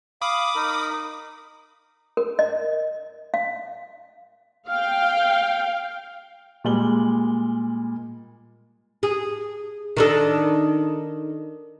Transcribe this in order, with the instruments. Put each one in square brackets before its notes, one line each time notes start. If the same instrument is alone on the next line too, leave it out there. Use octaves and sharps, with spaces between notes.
[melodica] F5 [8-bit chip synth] B5 D6 D#6
[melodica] D#4 A#4
[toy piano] A#4
D#5
F5
[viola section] F5 G5
[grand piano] A#2 G3 G#3 F#7 G7
[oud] G#4
D#3 D4 A4